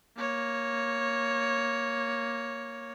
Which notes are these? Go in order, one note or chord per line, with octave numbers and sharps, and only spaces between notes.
A#3 C#5